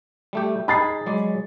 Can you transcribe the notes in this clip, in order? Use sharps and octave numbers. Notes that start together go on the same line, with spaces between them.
G3 A3 G4
D#4 G#4 B5 A6 C7
F#3 G#3 D5